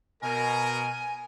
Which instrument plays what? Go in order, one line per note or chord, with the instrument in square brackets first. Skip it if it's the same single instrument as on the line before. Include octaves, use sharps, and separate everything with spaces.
[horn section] B2 A#4 [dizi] G#5